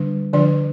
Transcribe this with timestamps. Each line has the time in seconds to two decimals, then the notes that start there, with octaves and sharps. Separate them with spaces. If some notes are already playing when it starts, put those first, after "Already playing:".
Already playing: D3 G3 D4
0.33 D3 F3 D4 D5